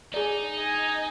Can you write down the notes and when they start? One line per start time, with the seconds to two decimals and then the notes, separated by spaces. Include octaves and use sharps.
0.14 D#4 G#4 D5
0.55 D#5 G#5